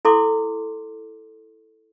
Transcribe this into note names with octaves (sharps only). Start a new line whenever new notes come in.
E4 A4 C6 D6